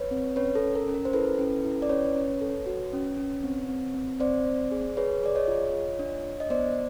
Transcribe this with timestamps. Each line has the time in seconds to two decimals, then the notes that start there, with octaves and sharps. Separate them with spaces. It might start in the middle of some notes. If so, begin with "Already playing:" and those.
Already playing: B4 C#5
0.11 C4
0.36 C#4 B4 C#5
0.55 A4
0.62 C#4
0.75 A#4
0.88 C#4
0.94 A#4
1.05 C5
1.13 E4 A4 B4
1.38 C#4
1.65 E4
1.82 D5
1.89 C#4 B4 C#5
2.16 C#4
2.41 A4
2.66 F#4
2.93 C#4
3.18 C#4
3.44 C4
3.69 C4
3.94 C4
4.20 C4 C5 D5
4.45 C4
4.72 G#4
4.97 G#4 B4 C#5
5.23 G#4 D5
5.35 C#5 D#5
5.48 F4
5.73 F4
5.99 D4
6.25 D4
6.40 D#5
6.50 B3 C5 D5